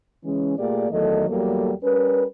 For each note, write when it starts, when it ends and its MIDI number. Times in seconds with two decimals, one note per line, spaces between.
0.24 0.57 49
0.24 0.57 52
0.24 0.57 56
0.24 0.57 61
0.57 0.90 46
0.57 0.90 57
0.57 0.90 58
0.57 0.90 67
0.57 0.90 68
0.57 0.90 74
0.91 1.28 40
0.91 1.28 51
0.91 1.28 54
0.91 1.28 57
0.91 1.28 69
0.91 1.28 75
1.28 1.71 40
1.28 1.71 54
1.28 1.71 55
1.28 1.71 58
1.28 1.71 69
1.83 2.23 55
1.83 2.23 61
1.83 2.23 70
1.83 2.23 71